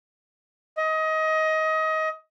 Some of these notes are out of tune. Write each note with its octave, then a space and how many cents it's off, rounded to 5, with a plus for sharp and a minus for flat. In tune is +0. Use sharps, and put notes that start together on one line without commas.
D#5 +25